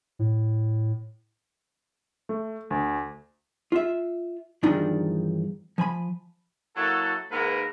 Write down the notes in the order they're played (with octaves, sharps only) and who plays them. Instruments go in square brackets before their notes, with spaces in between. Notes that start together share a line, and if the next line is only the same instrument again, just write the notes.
[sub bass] A2
[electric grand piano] A3
D2
[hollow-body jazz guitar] F4 E5
E2 G2 D#3 F3 D4 D#4
F3 G#5 B5
[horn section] F#3 A#3 E4 F#4 A4
G#2 D#3 A#3 B3 A#4 B4